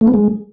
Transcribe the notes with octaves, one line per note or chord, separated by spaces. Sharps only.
A3
B3
G#3